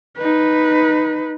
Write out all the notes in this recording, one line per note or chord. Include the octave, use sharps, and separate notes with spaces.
D#4 B4